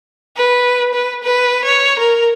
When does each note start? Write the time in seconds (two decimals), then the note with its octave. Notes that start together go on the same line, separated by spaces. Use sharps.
0.36 B4
0.94 B4
1.23 B4
1.65 C#5
1.99 A#4